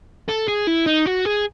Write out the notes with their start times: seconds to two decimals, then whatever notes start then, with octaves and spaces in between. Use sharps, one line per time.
0.28 A4
0.48 G#4
0.67 E4
0.86 D#4
1.06 F#4
1.25 G#4